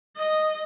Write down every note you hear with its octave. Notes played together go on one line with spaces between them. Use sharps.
D#5